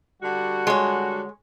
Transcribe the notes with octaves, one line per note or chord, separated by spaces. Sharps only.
D3 G3 F#4
G#3 C#5